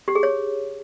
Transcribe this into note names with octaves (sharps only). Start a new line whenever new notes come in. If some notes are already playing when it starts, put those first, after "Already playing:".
G4
G#4
C#5